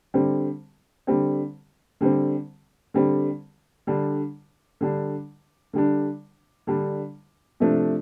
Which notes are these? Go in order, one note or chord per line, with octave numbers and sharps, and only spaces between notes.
D3 G3 C4
D3 G3 C4
D3 G3 C4
D3 G3 C4
D3 G3 D4
D3 G3 D4
D3 G3 D4
D3 G3 D4
C3 F3 A3 D4